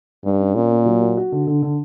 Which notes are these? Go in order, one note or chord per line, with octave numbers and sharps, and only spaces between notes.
G2 G3
C#4
A#2 C#4
A#3
F#3
F#4
F#4
D3
D3
D3